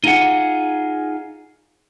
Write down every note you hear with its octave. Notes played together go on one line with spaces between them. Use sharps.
D#4 F4 G#4 F#5